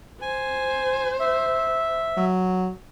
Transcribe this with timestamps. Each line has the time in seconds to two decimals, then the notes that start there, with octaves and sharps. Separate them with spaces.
0.22 C5 G#5
1.20 E5
2.17 F#3